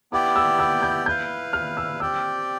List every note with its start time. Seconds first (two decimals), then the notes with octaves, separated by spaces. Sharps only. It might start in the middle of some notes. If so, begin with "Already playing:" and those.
0.12 B3 E4 G4 D5 G5 D6
0.36 E6
0.59 E6
0.82 G6
1.06 E4 B4 F5 G6
1.53 F6
1.77 E6
2.00 C4 G4 D5 G5 E6